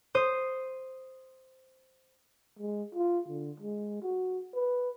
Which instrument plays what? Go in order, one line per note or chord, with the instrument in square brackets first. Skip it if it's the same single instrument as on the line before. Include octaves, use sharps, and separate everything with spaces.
[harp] C5 D#6
[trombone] G#3
F4
D3
G#3
F#4
B4